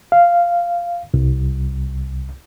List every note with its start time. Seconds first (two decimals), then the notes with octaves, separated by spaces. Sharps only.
0.12 F5
1.14 C2